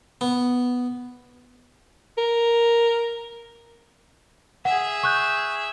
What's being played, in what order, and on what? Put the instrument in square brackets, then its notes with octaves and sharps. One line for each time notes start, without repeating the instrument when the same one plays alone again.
[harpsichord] B3
[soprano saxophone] A#4
[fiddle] G#4 E5 [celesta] F#5
[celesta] C#6 F#6 G6